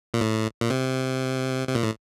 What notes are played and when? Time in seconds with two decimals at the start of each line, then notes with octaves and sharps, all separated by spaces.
0.14 A#2
0.21 A2
0.61 A#2
0.70 C3
1.68 C3
1.75 A#2
1.83 A2